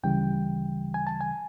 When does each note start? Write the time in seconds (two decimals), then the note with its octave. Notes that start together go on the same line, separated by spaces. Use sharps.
0.03 D2 C#3 E3 G3 G5
0.94 G#5
1.07 A5
1.21 G#5